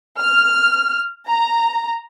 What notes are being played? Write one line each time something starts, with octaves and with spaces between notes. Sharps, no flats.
F6
A#5